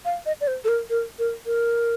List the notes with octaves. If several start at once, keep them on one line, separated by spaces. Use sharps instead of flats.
F5
D#5
D5
C5
A4
A#4
A#4
A#4
A#4